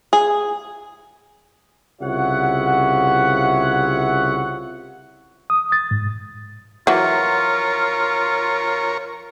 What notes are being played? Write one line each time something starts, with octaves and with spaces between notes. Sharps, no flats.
G#4
C2 C#3 F4 C#5 E5 F#5
D#6
A6
G#2
E3 F#3 F4 A#4 C#5